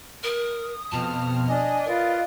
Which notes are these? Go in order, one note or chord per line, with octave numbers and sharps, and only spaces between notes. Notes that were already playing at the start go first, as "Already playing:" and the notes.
A#4 D#6
F2 B2 A5 F6
D4 D#5 G#5
F4 A#4 B4 D5